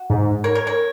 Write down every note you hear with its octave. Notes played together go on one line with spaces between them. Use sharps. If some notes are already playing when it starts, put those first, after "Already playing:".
Already playing: F#4
G#2
A#4 C#5
A#4 C#5
A#4 C#5